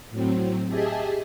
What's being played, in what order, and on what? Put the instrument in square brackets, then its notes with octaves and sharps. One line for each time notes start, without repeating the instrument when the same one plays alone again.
[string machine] A2 F#3 C4
G4 G#4 D#5 E5 G#5 A5